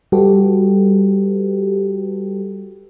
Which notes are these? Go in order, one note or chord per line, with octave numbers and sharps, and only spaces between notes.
G3 F#4 G4 A4 B4